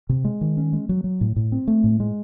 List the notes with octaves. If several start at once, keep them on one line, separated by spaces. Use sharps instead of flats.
C3
G#3
D#3
C#4
G#3
F#3
F#3
A2
A2
C4
A3
A2
G#3